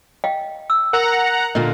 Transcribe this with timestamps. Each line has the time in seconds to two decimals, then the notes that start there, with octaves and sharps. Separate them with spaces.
0.24 D#5 F5 G5
0.70 E6
0.93 A#4 F#5 A#5
1.55 A#2 D3 A#3 D#5